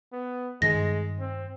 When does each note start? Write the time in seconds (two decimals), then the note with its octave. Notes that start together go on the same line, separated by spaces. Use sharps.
0.13 B3
0.62 G2 D#3 G#3 A#6
1.20 C4